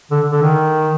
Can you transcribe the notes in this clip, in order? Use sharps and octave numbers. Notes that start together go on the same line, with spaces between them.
D3
D3
D#3